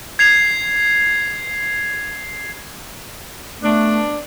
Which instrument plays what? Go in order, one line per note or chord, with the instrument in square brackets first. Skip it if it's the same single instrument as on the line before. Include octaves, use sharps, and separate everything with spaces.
[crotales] G#6 C7 F7
[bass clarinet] A3 [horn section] B3 D4